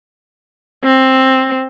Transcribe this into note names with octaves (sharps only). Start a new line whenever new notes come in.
C4